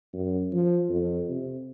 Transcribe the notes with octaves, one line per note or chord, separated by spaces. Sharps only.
F#2
F3
F2
C3